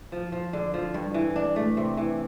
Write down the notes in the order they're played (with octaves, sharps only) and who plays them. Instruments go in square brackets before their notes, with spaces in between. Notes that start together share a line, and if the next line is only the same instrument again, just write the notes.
[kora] F3
F3
D3
F3
G2
E3
D4
A3
C3
E3